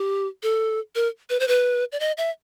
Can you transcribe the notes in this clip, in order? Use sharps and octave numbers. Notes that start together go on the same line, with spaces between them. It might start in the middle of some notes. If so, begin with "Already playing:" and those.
Already playing: G4
A4
A#4
B4
C5
B4
D5
D#5
E5